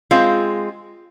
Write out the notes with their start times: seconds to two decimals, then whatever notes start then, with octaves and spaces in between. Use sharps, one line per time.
0.11 G#3 C4 F4